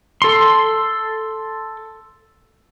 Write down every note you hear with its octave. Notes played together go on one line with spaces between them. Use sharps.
A4 C6